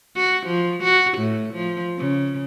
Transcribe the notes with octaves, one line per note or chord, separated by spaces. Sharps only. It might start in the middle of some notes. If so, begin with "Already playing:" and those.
F#4
F3
F#4
A2
F3
C#3